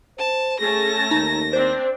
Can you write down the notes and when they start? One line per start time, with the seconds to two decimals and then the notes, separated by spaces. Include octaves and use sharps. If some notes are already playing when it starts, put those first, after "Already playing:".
0.18 C5 A5
0.60 A3 C#4 G#4 A5 A#6
1.11 D#2 D#4
1.53 C4 D4 C5